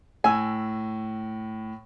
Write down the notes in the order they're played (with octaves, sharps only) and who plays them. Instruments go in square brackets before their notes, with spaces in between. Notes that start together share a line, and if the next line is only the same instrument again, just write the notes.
[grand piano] A2 E6 [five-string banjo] G#5